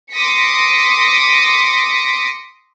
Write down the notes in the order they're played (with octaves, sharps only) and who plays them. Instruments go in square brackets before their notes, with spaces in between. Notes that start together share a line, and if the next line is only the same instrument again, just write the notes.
[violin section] C6 D6 D#6 A#6 B6 C#7